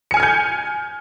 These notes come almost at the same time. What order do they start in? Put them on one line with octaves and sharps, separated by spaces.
C#7 G#5 F6 G#6 G6